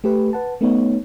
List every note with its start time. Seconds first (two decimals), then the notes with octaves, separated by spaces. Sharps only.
0.04 A3 G4 B4
0.33 B4 F#5 A5
0.61 A3 B3 D#4 C#5